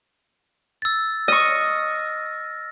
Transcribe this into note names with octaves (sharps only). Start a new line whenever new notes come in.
E6 A6
D#5 C#6 F6 A#6